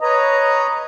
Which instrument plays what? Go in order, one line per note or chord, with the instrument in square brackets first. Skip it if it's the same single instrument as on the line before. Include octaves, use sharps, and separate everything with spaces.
[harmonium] B4 C#5 A#5 [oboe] D#5